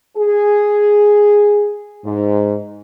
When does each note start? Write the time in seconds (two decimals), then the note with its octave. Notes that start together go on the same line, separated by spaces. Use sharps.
0.16 G#4
2.05 G#2